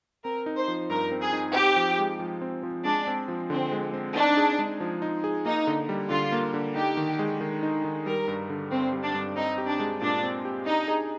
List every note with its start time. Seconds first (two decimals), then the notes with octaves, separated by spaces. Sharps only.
0.24 C4 A#4
0.46 D#4
0.57 C5
0.68 F3
0.90 G2 A#4
1.12 C4
1.22 G#4
1.33 D#4
1.54 C4 G4
1.76 F3
1.99 G#3
2.19 F3
2.41 C4
2.63 F3
2.85 G#3 D4
3.07 C4
3.28 F3
3.50 D3 C4
3.72 G#3
3.94 C4
4.15 D4 D#4
4.37 G#4
4.59 G#3
4.80 F3
5.02 D#4
5.24 G#4
5.45 A#3 D#4
5.67 D3
5.89 G3
6.10 D3 F4
6.32 A#3
6.54 D3
6.76 D#4 G4
6.97 D#3
7.19 G#3
7.41 D#3
7.63 D#4
7.84 D#3
8.06 G3 A#4
8.28 G2
8.50 D3
8.71 G2 C4
8.93 G3
9.04 D4
9.15 G2
9.36 C4 D#4
9.58 G4
9.69 D4
9.80 G#3
10.01 A#2 D4
10.23 C4
10.45 G4
10.66 D4 D#4
10.88 G#4